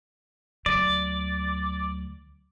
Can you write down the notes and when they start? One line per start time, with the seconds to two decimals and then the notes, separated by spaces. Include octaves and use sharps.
0.66 D2 F#3 D5